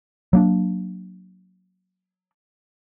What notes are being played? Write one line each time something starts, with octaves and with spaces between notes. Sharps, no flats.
F#3 A#3 D4